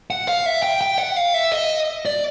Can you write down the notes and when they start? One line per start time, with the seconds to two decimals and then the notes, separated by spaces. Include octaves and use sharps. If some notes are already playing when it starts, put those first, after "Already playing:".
0.10 F#5
0.28 F5
0.46 E5
0.63 G5
0.81 G5
0.98 F#5
1.16 F5
1.34 E5
1.52 D#5
2.06 D5